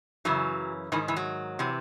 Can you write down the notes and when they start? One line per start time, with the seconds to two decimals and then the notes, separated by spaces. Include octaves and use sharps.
0.25 F#2 C#3 E3 F#3
0.92 G#2 D#3 E3
1.08 E3
1.16 F#3
1.59 C3 E3